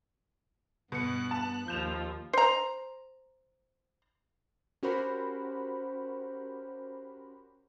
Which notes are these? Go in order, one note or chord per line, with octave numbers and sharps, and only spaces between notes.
G2 B2 B3 F#6 C#7
A5
D#2 F3 G6 E7 F7
C5 A#5
C#4 F#4 G4 A#4 C5 B5